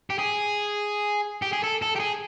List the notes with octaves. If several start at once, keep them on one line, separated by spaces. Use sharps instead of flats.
G4
G#4
G4
G#4
A4
A4
G4
G#4